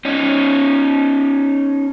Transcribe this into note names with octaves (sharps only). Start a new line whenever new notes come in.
C#4 D#4